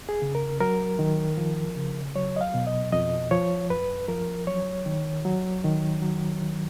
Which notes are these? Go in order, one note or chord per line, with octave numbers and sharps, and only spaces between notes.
G#4
C#3
A#4
F#3 A#4
D#3
F3
C#3
F#3 C#5
D#5
F5
B2
D#5
F2 D#5
F3 C#5
F#2 B4
F3 A#4
F#3 C#5
D#3
F#3
D#3
F#3
D#3